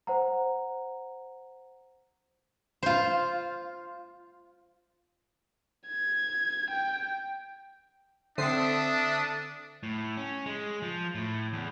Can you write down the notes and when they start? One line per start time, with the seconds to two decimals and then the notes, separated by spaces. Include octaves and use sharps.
0.07 C5 F#5 A#5
2.83 F4 C5
5.88 G#6
6.70 G5
8.38 D3 C4 D4 A4 E5 D#6 C7
9.83 A2
10.17 C#4
10.46 G#3
10.82 F3
11.15 A2
11.53 E2